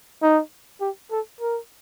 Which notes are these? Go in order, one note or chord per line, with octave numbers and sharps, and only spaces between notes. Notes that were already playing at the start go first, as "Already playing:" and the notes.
D#4
G4
A4
A#4